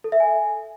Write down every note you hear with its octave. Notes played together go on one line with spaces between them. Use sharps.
A4
E5
G#5